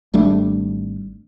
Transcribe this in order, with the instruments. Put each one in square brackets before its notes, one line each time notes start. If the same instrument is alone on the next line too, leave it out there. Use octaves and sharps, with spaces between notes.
[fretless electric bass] G#1 G3 A3 D4